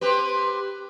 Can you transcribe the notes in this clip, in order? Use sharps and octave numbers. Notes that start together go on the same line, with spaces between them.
C4 G4 B4